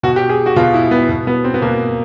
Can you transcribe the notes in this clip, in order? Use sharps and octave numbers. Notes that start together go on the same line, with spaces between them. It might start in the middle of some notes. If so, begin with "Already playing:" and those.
B2 F#4
G4
G#4
F#4
B2 F4
E4
B3
B2
B3
C4
B3
B2 A#3